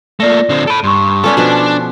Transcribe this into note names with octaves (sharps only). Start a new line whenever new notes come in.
A3 A#3 F4 D5 A#6
D3 C4
A4 B5 D7 D#7
G2 C6 C#6
B3 C#4 F4 A4 D5
B2 F3 B3 D4